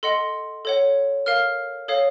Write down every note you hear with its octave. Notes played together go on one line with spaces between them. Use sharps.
A4 D#5 F#5 C6
A4 C#5 F#5
A#4 F5 F6
A4 C#5 F5 D#6